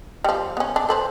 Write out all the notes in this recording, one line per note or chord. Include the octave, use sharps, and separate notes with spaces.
F3 G3
B3 C#4
D4
A4 B4 C5